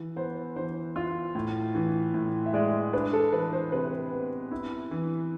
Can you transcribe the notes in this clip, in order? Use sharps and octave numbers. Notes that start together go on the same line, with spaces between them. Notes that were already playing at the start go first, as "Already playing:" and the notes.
Already playing: E3
B3 C5
E3 C5
F4
A2
E3
A2
E5
G#3 D5
D4 B4
A4
E3 B4
C5
C3 B4
B3
E4
E3